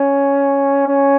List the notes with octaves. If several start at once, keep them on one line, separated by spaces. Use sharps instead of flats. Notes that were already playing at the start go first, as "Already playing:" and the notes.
Already playing: C#4
C#4